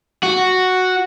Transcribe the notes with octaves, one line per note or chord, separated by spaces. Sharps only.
F#4